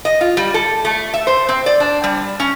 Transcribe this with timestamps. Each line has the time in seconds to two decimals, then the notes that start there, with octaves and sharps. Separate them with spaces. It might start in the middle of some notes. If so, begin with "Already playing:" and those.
0.05 D#5
0.21 F4
0.37 G3
0.54 A4
0.85 A3
1.14 E5
1.27 C5
1.49 C4
1.66 D5
1.80 D4
2.04 G3
2.40 C#4